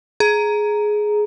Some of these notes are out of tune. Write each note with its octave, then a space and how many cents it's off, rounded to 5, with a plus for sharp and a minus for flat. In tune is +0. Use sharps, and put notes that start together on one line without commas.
G#4 +15 A#5 +0